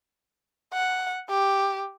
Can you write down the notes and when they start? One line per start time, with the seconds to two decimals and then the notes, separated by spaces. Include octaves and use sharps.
0.73 F#5
1.29 G4